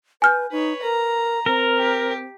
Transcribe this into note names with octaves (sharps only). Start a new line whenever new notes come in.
B4 G#5 F6 G6
D#4 B4 C#5
A#4 A#5
C4 A#4
G4